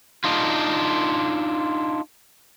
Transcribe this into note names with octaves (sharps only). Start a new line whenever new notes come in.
D4 D#4 F4